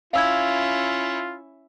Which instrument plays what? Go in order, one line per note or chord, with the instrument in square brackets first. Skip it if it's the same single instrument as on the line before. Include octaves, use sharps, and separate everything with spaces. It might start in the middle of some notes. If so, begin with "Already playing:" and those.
[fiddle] C#4 E4 [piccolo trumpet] F4 [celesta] F5 E6 G#6